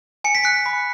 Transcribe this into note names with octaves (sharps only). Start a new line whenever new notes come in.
G#5 C#7
B6
F#6 C#7
B5